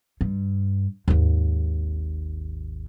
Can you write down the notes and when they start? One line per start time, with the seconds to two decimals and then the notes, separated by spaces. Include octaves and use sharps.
0.21 G2
1.08 G#1 D#2